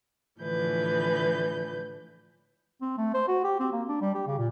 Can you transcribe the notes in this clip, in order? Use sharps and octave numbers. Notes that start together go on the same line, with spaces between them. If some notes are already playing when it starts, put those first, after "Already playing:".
A2 D3 E3 F3 B4 G6
C4
A3
C5
F#4
G4
C4
A#3
D4
G3
G4
C#3
A#2